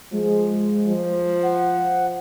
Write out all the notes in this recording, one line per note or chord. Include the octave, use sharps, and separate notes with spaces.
F3 G#3
F3
F#5